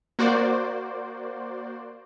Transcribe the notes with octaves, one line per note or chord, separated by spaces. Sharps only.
A#3 F#4 C5 D5